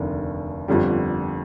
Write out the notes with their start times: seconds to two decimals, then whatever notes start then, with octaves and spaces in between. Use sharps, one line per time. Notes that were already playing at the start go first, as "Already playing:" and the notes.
Already playing: F1 D#2 D3
0.68 G1 F2 D3 G3